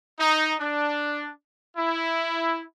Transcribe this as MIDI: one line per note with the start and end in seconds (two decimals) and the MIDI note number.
0.19 0.53 63
0.59 1.31 62
1.77 2.62 64